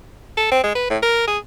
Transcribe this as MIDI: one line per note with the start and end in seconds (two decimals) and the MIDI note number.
0.37 0.49 69
0.51 0.60 60
0.64 0.74 56
0.75 0.90 71
0.90 0.98 45
1.03 1.26 70
1.27 1.38 68